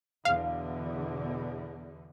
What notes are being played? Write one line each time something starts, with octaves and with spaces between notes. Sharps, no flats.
E2 B2 D3 F5